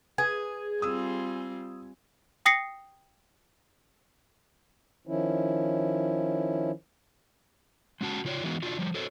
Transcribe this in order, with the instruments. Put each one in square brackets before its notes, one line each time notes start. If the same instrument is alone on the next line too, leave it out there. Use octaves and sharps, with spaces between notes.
[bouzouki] G#4 [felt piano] B4 [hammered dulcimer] G#5
[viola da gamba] G3 C4 F4 [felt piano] D#6 E6
[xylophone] G5 D#6 A#6 C7 C#7
[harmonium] D#3 F3 C#4 E4
[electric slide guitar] G#3 C#4 F#4 A5
C#3 F4 C#5 D5
E3 G#3 B3 D#4 F#4
D4 F4 F#4
F3 G3
F#4 A4 C5 C#5